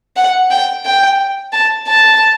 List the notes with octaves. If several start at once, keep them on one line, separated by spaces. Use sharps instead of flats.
F#5
G5
G5
A5
A5